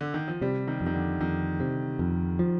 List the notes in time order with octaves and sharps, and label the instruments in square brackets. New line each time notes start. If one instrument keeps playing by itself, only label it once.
[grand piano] D3
D#3
F3
[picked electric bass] C3 [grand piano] G3
[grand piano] D#3
[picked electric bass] F2
[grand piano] D#3
D3
[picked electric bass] F2 [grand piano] D#3
[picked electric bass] C3
F2
F3